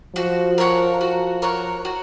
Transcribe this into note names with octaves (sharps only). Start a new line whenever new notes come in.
F3 F#4
A#4 C#5 F#5
F#4
A#4 C#5 F#5
F#4